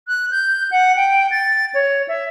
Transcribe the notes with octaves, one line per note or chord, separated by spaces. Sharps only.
F#6
G6
F#5
G5
A6
C#5
E5